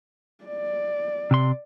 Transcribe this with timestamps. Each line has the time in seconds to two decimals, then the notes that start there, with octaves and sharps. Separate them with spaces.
0.44 D5
1.31 C3 C6